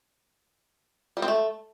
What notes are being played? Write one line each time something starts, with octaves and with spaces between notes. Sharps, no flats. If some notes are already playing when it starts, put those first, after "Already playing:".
G3
C4
A3